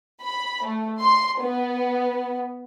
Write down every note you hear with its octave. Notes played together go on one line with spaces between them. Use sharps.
B5
A3
C6
B3